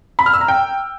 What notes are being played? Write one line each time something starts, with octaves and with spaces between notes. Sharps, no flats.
B5
F6
E6
A#5
G5